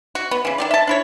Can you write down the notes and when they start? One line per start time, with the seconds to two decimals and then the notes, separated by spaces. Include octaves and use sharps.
0.15 F#4
0.31 B3
0.45 C#3 E3
0.58 D#3 C4 D5
0.71 E5 A5
0.87 D4 E4 C#5